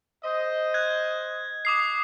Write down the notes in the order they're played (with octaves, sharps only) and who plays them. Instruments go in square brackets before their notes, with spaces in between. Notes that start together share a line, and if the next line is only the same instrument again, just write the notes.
[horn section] C5 D#5
[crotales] F#6 G#6
D6 D#6 C7